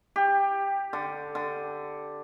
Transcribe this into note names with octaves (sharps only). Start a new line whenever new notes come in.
G4
D3
D3